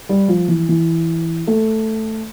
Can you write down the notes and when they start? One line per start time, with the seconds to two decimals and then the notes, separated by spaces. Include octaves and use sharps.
0.09 G3
0.28 F3
0.48 E3
0.69 E3
1.47 A3